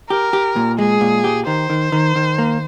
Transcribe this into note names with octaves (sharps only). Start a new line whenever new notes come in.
G4 A#4
G4
A#2
G#3 G#4
A#2
G4
D#3 C5
D#3
D#3
D#3
A#3